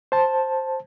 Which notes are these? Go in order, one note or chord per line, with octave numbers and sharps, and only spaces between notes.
C5 A5